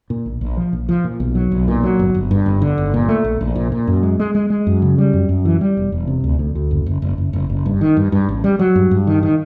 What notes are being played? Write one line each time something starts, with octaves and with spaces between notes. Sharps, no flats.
A#2
A#1
A#1
F3
A#1
F3
A#2
B1
F#3
B1
A#2
F#3
G1
G1
G2
G1
D3
G1
A#2
A3
A#1
A#1
A#2
A#2
F#2
G#3
G#3
G#3
G#3
F#2
C#3
G3
F#2
F#2
E3
G3
E1
E1
C3
D2
D2
D2
F#1
F#1
F#1
F#1
F#1
F#1
G2
D#3
G2
G2
A1
G3
F#3
G2
G2
D#3
D#3